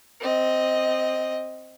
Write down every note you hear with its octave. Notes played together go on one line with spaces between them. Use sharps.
C4 D#5